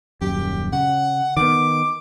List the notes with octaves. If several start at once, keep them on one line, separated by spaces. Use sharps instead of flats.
D#1 F#2 G4
C#3 F#5
D#3 B3 D6